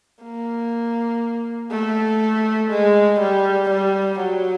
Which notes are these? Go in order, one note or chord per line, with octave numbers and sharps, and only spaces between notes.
A#3
A3
G#3
G3
G3
F#3